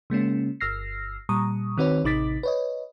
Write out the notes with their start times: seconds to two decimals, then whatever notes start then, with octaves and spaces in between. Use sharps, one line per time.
0.10 C#3 G#3 A#3 C#4
0.60 G1 E6 F6 A#6 C7
1.29 A#2 G3 A#5 C#6 D#6
1.78 D#3 C4 F#4 B4 C#5
2.04 A1 C3 D#4 D6 A6 B6
2.43 B4 C#5 D#5